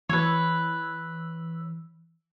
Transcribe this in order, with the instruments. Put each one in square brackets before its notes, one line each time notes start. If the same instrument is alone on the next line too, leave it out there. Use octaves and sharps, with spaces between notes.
[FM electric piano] E3 E6 [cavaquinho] B4 C#5